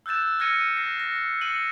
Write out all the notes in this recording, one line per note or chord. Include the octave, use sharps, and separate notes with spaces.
E6 F#6 G6 A6 E7
E6 F6 G#6 A#6 C#7 D#7
D#7
A#6 C7
A#6
C#7 D#7 F#7